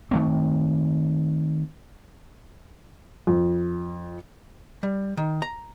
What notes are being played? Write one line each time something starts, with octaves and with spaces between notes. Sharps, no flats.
D#3 A3 C4
F2
G3
D#3
A#5